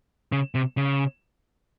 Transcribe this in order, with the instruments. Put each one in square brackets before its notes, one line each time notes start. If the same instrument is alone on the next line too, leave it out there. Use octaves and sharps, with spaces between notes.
[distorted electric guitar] C#3
C3
C#3